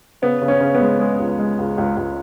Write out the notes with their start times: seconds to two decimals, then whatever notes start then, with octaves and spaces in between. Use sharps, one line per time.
0.22 C#3 B3
0.42 C#3
0.48 C#4
0.61 C#3
0.75 B3
0.81 G#3
1.00 G#3
1.19 C#2
1.38 G#3
1.58 C#2
1.78 C#2
1.97 C#2